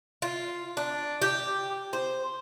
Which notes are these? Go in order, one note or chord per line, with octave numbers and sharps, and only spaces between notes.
F4
D4
G4
C5